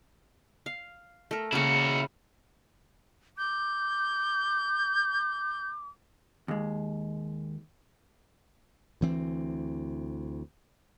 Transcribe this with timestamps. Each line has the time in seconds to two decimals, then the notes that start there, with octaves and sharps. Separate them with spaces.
0.66 F5
1.31 A3 A#4
1.52 C#3 A#3 E4 F#4
3.38 D6 G6
6.48 D#2 G#3
9.01 D2 E3 C4